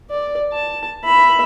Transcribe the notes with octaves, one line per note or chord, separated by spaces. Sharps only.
D5
A5
E5 B5